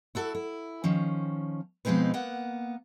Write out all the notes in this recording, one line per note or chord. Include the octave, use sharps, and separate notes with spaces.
E4 F#4 A4
E4
D#3 F3 C#4
B2 F3 G#3 C4 D#4 B4
A#3 B3 F#5